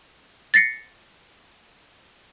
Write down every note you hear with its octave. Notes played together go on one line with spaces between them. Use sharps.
A6 A#6 C7 C#7